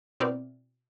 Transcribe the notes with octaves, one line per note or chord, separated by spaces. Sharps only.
B2 C4 E4 A#4 D5